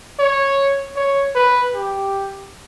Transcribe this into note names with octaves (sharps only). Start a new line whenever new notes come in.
C#5
C#5
B4
G4